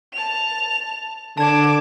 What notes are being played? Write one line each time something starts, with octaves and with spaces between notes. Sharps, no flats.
A5 F7
D3 A5 D6 G#6 E7